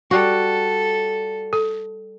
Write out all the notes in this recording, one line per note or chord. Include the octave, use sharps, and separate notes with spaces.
G3 F#4 A4
A4